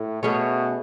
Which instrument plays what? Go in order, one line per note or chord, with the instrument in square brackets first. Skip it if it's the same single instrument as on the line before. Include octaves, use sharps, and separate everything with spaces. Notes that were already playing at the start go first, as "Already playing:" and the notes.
Already playing: [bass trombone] A2
[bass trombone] B2 [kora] A3 C#4 G#4 C#5